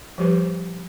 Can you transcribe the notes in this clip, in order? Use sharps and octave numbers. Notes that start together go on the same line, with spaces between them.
F3 G3 G4 B4 C5